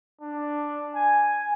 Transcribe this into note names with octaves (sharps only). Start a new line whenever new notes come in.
D4
G#5